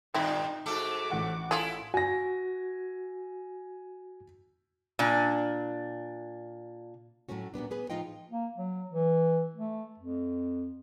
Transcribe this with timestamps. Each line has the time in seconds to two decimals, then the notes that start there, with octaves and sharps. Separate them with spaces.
0.14 G2 A#2 D#3 C4 D#4 E4
0.66 G#2 A3 F#4 A4 D6
1.10 A1 F#5
1.51 E4 F4 G#4 A4
1.94 F#4 G#5 A#6
4.99 A#2 D4
7.29 A2 F#3 A3 C#4 F#4
7.54 A#2 G3 B3 D4
7.71 B3 G#4 B4
7.90 A2 F3 D#4 F4 D#5 G5
8.31 A#3
8.57 F#3
8.89 E3
9.55 A3
9.99 F2